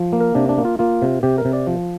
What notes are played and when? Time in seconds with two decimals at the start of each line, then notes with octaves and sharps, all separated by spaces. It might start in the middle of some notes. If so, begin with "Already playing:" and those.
Already playing: F3
0.13 A#3
0.21 A#4
0.35 C3 D4
0.49 D4
0.58 A#3
0.65 F4
0.79 A#3 F4
1.02 C3
1.23 C3 G4
1.38 A#4
1.45 C3
1.53 D5
1.67 F3